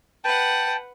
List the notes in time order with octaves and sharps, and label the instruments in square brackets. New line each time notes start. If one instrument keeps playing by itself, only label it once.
[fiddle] B4 F#5 [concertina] G5 A5